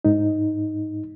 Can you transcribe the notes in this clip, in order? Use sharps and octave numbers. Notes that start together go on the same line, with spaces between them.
G#2 D#4